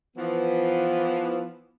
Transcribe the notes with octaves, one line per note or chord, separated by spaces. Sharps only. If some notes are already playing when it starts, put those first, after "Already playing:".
E3 F3 B3